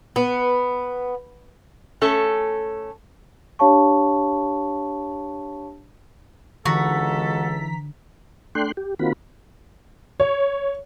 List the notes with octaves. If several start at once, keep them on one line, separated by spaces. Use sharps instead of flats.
B3
A3 C#4 A4
D4 G4 C#5 F5 A5 C#6
C#2 D3 E3 G#3 F#4 A4 A#5 B6
A3 D4 G5 C6 F#6
G4
D#3 A#3 C4 F4 F#4 B5
C#5